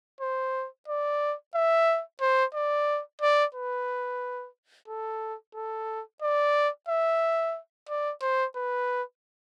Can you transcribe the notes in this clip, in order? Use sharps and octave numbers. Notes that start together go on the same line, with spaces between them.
C5
D5
E5
C5
D5
D5
B4
A4
A4
D5
E5
D5
C5
B4